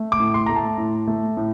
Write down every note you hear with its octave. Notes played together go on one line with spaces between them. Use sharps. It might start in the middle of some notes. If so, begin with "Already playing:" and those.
Already playing: A3
D6
A2
C6
A3 A#5
A5
A2
A3
A2